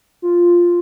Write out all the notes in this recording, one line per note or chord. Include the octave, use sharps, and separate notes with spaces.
F4